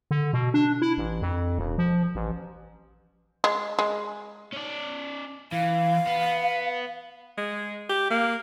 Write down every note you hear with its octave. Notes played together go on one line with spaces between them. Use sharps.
D3
B2
D4
E4
A1
F2
E1
F3
A1
G#3
G#3
C#4 D5
E3 F5
B3
G#3
G4
A#3